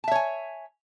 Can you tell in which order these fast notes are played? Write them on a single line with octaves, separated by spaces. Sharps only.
A5 E5 C#5 G#5